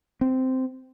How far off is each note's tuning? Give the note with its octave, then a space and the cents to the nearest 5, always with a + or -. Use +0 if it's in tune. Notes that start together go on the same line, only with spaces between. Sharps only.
C4 -10